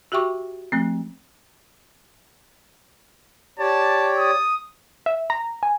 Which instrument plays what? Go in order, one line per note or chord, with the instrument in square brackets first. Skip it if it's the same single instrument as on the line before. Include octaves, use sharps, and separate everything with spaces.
[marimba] F#4 G4 E5 G5 C#6 D6
F3 A3 C4
[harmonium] G4 C#5 D5 [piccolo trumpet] A5
[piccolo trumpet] D#6
[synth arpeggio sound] E5
A#5
G#5